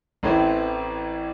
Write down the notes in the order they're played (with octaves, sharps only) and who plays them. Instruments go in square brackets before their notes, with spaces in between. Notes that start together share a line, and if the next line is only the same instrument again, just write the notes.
[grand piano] A1 A2 E3 A3 C4